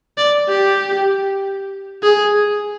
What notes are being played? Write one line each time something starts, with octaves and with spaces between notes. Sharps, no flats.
D5
G4
G#4